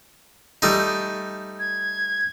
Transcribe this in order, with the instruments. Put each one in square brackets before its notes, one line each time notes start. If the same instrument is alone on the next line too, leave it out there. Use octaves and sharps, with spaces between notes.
[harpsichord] G3 A3 D#4
[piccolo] G#6